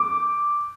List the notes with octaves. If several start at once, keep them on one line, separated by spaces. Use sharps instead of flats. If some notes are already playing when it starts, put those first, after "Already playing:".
Already playing: D6